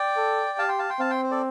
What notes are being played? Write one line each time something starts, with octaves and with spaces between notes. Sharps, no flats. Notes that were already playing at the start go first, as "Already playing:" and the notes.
Already playing: D5 G5
A4
G4 F5 A5
G5 C6
F5 A5
G5 C6
C4 F5 A5
G5 C6
C5
A4 D5